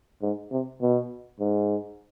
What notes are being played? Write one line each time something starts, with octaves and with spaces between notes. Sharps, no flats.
G#2
C3
B2
G#2